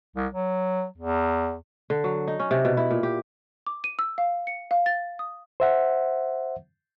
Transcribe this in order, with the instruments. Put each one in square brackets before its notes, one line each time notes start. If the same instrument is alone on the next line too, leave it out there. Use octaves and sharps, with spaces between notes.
[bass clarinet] C2
F#3
E2
[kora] D3
F#3
D#4
C#4
C3
B2
E4
A#2
G4
[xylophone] D6
D#7
E6
F5
C#7
F5
A6
D#6
[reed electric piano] C5 E5 F#5